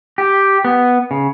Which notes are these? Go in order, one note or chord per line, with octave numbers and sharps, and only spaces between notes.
G4
B3
C#3